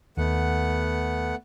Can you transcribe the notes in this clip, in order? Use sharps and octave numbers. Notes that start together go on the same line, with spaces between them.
D#2 A3 B3 F#5